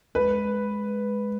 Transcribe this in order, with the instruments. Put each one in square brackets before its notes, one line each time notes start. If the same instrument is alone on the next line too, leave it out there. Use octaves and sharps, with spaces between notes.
[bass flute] G#3 [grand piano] B4